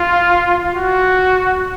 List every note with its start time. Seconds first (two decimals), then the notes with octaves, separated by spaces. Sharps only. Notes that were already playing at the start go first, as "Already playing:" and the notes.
Already playing: F4
0.74 F#4